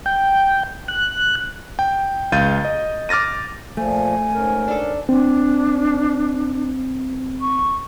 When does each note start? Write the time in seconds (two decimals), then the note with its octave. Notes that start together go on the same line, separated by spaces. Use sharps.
0.06 G5
0.88 F#6
1.79 G5
2.32 C#2 F5 G6 A6 D#7
2.65 D#5
3.09 D6 F6 A6 A#6 D#7
3.77 A#2 F3 A3 G#5
4.34 G#2 C#4 A#4
4.68 D4 A4
5.09 C4 D4
7.41 C#6